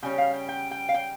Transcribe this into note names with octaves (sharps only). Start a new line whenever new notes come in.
C#3 G3 C#4 G5
F5
G5
G5
G5
F5
G5